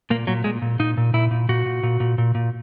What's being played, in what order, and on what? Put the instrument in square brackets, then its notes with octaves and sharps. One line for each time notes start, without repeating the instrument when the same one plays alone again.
[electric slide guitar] A#2 A#3
A#2 F#3
A#2 G#3
A#2
A#2 D#4
A#2
A#2 E4
A#2
A#2 F#4
A#2
A#2
A#2
A#2
A#2